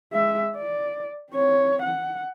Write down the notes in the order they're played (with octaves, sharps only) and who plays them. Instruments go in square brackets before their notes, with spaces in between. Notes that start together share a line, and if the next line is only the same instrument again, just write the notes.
[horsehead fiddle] G#3 E5
D5
C4 C#5
F#5